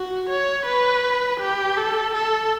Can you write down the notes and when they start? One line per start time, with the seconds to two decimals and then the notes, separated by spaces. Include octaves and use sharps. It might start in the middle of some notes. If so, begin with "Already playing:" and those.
Already playing: F#4
0.29 C#5
0.66 B4
1.40 G4
1.77 A4
2.15 A4